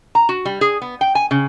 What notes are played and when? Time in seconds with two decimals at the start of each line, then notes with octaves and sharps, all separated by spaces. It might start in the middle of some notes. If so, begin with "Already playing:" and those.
0.15 A#5
0.29 F#4
0.45 G3
0.61 G#4
0.82 B3
1.01 G5
1.15 G#5
1.31 C#3